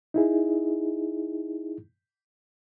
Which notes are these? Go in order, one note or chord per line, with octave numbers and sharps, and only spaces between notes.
D#4 E4 G#4